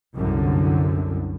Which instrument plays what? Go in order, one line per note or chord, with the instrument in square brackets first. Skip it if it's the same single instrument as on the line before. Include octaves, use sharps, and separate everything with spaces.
[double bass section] C2 F#2 D3